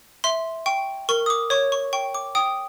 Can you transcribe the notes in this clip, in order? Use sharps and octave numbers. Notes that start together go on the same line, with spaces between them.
E5 C6
G5 C#6
A#4 C#6
D#6
D6
C#5 C#6
C#6
G5 C#6
D6
G5 D#6